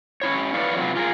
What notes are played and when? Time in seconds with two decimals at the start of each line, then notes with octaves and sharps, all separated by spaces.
0.22 C#4 E4 C#5
0.54 E4 B4 C#5 D5 F5
0.75 C3 E3 F#3 F4
0.95 F4 G#4 A#4